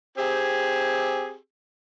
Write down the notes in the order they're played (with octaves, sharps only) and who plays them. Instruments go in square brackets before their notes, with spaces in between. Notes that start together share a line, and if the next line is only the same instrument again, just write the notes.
[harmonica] C4 G4 G#4